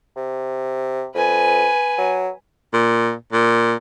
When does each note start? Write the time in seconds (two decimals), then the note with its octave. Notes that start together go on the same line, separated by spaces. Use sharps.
0.17 C3
1.15 F2 B4 G#5
1.98 F#3
2.73 A#2
3.33 A#2